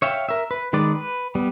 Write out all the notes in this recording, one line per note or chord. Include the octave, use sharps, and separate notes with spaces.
C#5 E5 F5 G5
A#4 E5
B4
D#3 G#3 B4 D5
B4
G3 B3